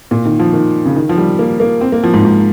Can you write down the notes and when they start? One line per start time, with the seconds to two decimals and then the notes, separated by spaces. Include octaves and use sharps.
0.11 A#2
0.25 D#3
0.39 F3
0.53 D#3
0.85 C#3
0.96 D#3
1.09 F3
1.18 G3
1.39 A#3
1.60 A#3
1.81 C4
1.92 A#3
2.04 F3
2.14 G#2
2.25 G#2